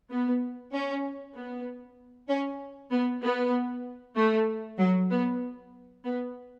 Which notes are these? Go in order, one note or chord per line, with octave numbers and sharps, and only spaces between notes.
B3
C#4
B3
C#4
B3
B3
A3
F#3
B3
B3